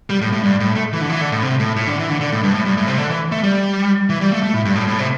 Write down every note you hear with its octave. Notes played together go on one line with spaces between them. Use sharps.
G3
A2
A2
G2
A2
A3
E3
D3
E3
D3
A2
C3
A2
A2
D3
E3
D3
D3
A2
G2
A2
G2
A2
C3
D3
E3
A3
G3
E3
G3
A3
A3
A2
G2
A2
A2
C3